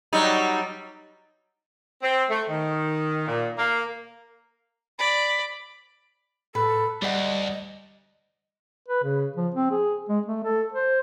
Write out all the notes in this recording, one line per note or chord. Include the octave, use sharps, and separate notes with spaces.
F#3 G3 D#4
C4
A3
D#3
A#2
A#3
D5 B5
A2 A4 B4
D2 G3 D5 D#5 F#5
B4
C#3
F3
C4
G#4
G#3
A3
A4
C5